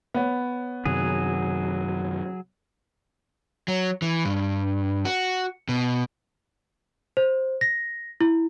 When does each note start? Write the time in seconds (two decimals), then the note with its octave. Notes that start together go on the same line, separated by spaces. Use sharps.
0.14 B3 C#5
0.85 F#2 C3 D#3 F#3 G#4
3.68 F#3
4.02 E3
4.25 G2
5.05 F#4
5.69 B2
7.17 C5
7.61 A#6
8.21 E4